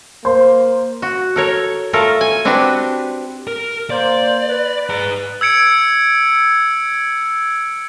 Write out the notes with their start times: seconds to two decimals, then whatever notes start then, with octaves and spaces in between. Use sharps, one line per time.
0.25 A#3 C5
1.02 F#4
1.36 A4 A#4 C#5
1.93 A3 F4 A4 A#4
2.21 G#5
2.45 C4 D4 F#4 G4 B4
3.47 A#4
3.90 A#3 C5 D5
4.49 B4
4.90 G#4 A#5
5.41 E6 G#6 C#7 D7